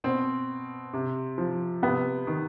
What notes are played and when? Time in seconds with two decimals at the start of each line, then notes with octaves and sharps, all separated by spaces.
0.04 B2 C4
0.93 C3
1.38 F3
1.82 C3 B3
2.27 D#3